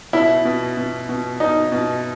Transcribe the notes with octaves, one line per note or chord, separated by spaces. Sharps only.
B2 E4
B2
B2
B2
B2 D#4
B2